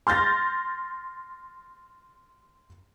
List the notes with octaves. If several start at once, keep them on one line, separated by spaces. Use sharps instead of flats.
C6 F6 G6 A6 A#6